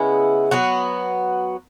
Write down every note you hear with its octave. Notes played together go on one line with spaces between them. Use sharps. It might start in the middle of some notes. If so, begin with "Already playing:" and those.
Already playing: C#3 G#3 B3 E4
F#3 B3 F#4